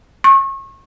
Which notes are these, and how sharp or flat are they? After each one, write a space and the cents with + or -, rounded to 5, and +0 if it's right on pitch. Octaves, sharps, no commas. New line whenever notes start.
C#6 -30